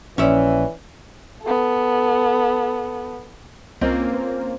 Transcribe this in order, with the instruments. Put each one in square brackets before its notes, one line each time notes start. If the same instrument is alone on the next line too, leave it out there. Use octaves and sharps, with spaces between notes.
[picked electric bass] A#1 [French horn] E3 [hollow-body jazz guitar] C#4 E5 [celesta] C#5 D5
[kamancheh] B3 A4
[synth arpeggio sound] C2 D#5 G6 [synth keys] A#3 C#4 F4 [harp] C4
[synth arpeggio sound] B4